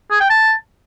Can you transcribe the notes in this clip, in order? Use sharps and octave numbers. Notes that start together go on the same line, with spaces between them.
G#4
G5
A5